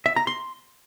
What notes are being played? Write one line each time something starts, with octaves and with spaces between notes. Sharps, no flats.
E5
A#5
C6